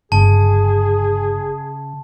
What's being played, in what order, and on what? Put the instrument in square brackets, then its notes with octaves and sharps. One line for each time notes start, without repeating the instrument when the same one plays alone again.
[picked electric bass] G1 [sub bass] C#3 [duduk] G#4 [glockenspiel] A5